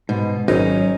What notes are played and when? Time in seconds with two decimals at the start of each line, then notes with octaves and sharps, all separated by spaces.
0.09 G#2 B2
0.48 G#1 F#3 C#4 D#4